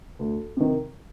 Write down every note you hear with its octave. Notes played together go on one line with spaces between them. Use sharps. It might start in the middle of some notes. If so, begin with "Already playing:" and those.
D2
C3 D#3